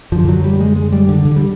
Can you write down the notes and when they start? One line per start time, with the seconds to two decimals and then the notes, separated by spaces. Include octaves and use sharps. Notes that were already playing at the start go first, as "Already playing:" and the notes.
0.12 F#2 D3 F3
0.28 F#3
0.44 G3
0.60 G#3
0.76 G#3
0.92 G3
1.09 D3
1.25 D3
1.36 G3